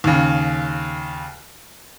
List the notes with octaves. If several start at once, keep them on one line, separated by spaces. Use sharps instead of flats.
D#2 C#3